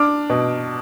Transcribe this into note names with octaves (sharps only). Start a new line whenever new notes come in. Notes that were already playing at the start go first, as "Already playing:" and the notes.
Already playing: D4 D6 F6
B2